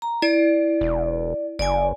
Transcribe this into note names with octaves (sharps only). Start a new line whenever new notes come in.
A#5
E4 D5
E1
F#1 D5 G#5